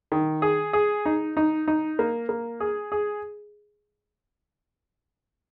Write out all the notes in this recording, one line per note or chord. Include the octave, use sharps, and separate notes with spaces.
D#3
G#4
G#4
D#4
D#4
D#4
A#3
A#3
G#4
G#4